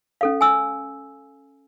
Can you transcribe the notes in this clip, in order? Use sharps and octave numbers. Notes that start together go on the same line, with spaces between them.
C#4 A4 F5
G#5 E6